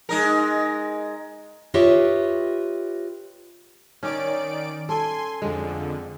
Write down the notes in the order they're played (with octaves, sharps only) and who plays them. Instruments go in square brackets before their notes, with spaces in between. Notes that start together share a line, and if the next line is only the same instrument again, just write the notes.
[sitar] G#3 D#4 A#4
[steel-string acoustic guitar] F4 G4 B4 C#5 D#5 E5
[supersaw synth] D#3 D5 D7 [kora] C#4
[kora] A4 [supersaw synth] G#5 C6
[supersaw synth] F2 D3 [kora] G#3